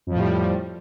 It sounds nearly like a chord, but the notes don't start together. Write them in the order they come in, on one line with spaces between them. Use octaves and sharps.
F2 F3 A2 G3